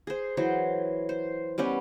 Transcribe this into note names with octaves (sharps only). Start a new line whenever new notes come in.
G#4 C5
E3 F#3 C5
C5
G3 B3 C#4 G4